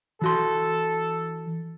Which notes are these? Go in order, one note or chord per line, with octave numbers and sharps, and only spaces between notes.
E3 F#4 A4 C6